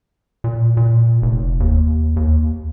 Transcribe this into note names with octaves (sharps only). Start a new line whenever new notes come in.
A#2
A#2
F1
D#2
D#2